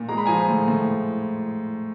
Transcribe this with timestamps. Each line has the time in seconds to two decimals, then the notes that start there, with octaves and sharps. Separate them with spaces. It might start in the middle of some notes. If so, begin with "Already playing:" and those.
Already playing: A#2
0.09 G#3 A#5
0.18 B5
0.25 F3 G#5 A#5
0.49 A2
0.68 A2